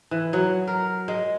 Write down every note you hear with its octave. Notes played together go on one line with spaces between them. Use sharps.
E3
F#3
A#4
G#3